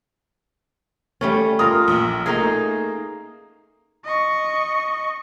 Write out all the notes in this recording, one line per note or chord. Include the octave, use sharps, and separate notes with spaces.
G3 A3 C#4
F4 A#4 D#6
A#1
A3 A#3 D#4 G#4
D#5 C#6